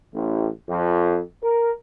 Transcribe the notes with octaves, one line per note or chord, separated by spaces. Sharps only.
A1
F2
A#4